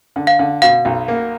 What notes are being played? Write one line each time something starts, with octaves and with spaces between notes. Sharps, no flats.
D3
F5
D3
B2 F5
B1
A#3